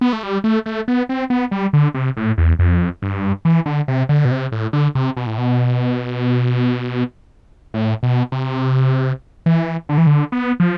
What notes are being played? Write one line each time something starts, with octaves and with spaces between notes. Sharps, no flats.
B3
A3
G3
A3
A3
B3
C4
B3
G3
D3
C3
A2
E2
F2
G2
E3
D3
C3
D3
B2
C3
A2
D3
C3
B2
A2
B2
A2
B2
C3
E3
D3
E3
D3
B3
F3